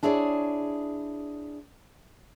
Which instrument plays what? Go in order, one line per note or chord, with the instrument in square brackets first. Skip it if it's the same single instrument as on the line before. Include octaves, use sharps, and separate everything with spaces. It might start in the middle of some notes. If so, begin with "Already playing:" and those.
[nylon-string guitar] D4 E4 G#4 C#5 D5